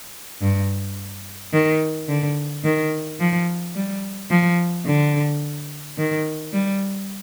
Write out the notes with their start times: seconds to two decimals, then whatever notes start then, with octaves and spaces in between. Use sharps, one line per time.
0.42 G2
1.53 D#3
2.08 D3
2.64 D#3
3.20 F3
3.75 G3
4.30 F3
4.86 D3
5.98 D#3
6.53 G3